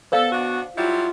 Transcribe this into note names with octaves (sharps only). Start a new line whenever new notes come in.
B3 A4 C5 D5 F5
B2 D4 F#4
F#3 G3 E4 F4